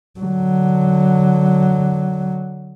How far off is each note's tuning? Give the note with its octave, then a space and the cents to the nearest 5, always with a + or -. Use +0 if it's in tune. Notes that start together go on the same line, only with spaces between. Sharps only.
D3 +0 F#3 +0